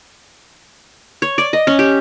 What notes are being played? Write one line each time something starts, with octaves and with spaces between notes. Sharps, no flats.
C#5
D5
D#5
C#4
G4